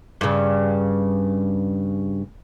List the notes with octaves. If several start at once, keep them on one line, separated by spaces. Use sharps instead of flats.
G2 C#3